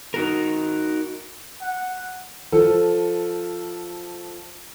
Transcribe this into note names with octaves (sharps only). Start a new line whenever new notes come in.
D#4 F#4 A#4
F#5
F3 A4